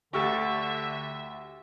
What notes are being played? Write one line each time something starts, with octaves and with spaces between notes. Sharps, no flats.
D2 D3 G4 E5 C#6 E6 A6